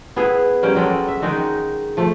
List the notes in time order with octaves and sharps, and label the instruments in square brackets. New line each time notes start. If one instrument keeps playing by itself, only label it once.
[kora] B3 E4 G#4 B4
G3 A#3 C#4 G4
F#3 G#3 G4 A4
E5
D#3 G#3 D#4 F#4
F3 A3